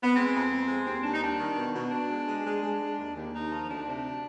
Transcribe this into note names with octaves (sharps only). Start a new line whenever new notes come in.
B3
G#3 C4
F2
F2
G#3
D#2 C4
D#2 D4
D#4
G3 D4
D#3
B2
B2
B2 D4
G#3
G#3
G#3
G#3
G#3
D#2
D#2
D#2 D#4
F3
D2 D4
C3